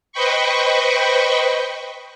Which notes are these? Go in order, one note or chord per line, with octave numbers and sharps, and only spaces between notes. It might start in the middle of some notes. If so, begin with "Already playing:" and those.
B4 C5 D#5 G5 B5 C#6